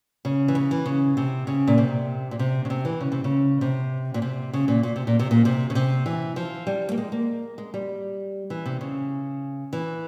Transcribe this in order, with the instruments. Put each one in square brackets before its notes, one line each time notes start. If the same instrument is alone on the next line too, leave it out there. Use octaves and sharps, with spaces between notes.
[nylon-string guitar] C#3
E3
C#3
E3
C#3
C3
C#3
A#2
C3
A#2
C3
C#3
C3
E3
C#3
C3
C#3
C3
A#2
C3
C#3
A#2
A#2
C3
A#2
C3
A#2
C3
C#3
C3
E3
F3
G3
A#3
G#3
A#3
G#3
G3
E3
C3
C#3
E3